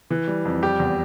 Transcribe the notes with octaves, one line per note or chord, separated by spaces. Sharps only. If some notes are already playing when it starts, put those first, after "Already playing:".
E3
G3
F2
G3 G4
E2